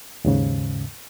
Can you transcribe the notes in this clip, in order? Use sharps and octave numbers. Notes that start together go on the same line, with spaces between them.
D#2 G#2 C#3